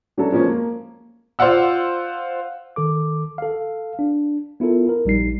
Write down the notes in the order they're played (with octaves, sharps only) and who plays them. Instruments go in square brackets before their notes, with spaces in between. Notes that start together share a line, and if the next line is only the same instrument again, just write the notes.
[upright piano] E3 F#3 C#4 D4 F#4 A4
F3 G#3 A#3 C#4
A#3
[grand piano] F4 C5 D5 F5 F#5 E6
[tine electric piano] D#3 A4 D6
A4 F5
D4
B3 E4 F4 A4 A#4
A#4
A#1 G3 D#4 C7